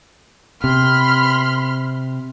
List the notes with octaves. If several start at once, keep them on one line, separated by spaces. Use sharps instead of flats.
C3 B5 C6 F6